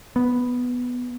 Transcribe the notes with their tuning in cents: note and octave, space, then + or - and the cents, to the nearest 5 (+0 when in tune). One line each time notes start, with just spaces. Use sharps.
B3 +0